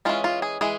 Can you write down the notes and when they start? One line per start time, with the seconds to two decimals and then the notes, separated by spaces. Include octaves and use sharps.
0.05 E3 G#3 C#4 F4
0.24 F4
0.42 G#4
0.61 E3 G#3 G#4